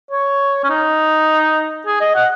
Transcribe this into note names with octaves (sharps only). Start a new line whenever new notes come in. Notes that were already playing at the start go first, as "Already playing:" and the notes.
C#5
C#4
D#4
G#4
D#5
F#5